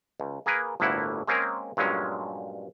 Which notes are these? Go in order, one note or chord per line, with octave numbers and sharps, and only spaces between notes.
C#2
A#3 G#4 A#4 B4
G1 D2 A2 A#3 E4 F#5
G#3 A#3 C4 C#4 G#4 A#4
G2 A#2 F#3 G#3 C#4